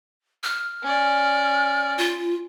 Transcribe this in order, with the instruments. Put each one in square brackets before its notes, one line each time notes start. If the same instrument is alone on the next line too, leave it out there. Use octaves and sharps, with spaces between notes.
[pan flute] F6
[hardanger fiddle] C#4 D5
[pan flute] F4